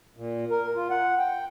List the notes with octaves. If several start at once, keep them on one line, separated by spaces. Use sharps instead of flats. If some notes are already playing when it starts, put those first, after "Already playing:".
A#2
A#4
F4
F#5
G5